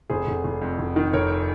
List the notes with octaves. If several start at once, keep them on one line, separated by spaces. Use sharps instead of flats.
F1 G#4 C5
F1
F1
F2
F1
D#3
F1 A#4 C#5